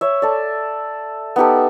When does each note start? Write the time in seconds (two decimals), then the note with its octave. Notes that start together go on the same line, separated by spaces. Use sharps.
0.01 C#5 E5
0.22 A4 D5
1.36 B3 D#4 G4 A4